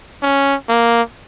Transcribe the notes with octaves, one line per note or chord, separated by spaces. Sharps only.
C#4
A#3